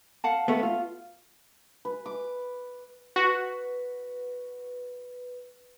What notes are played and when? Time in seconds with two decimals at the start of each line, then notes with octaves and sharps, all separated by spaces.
0.24 F5 F#5 A5
0.48 A3 B3
0.63 F4
1.85 B4
2.06 D6
3.16 F#4 B4